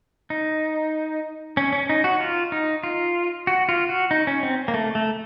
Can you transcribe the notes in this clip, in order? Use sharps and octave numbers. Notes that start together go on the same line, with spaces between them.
D#4
C#4
C#4
D#4
F#4
F4
D#4
F4
F#4
F4
F#4
D#4
C#4
C4
A#3
A3
A3